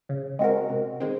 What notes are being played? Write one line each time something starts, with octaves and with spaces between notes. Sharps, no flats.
C#3
G#3 C4 F#4 A#4
C3
D#3 G#3 C4